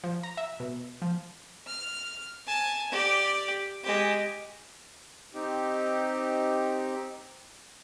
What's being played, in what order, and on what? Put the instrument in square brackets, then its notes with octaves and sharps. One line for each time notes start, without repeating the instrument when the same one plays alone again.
[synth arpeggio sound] F3
A#5
E5
B2
F3
[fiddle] F6
G#5 A5
G4 D5
G#3 G4
[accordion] C4 D#4 G4